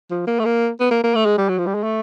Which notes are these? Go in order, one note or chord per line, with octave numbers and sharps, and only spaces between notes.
F3
A#3
A3
A#3
B3
A#3
A#3
A3
G#3
G3
F#3
F3
G3
G#3
A3